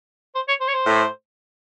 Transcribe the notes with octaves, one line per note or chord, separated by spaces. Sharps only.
C5
C#5
C5
C#5
C5
A2